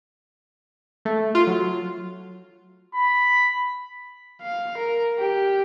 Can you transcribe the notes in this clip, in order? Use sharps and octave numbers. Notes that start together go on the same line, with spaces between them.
A3
F4
F#3
B5
F5
A#4
G4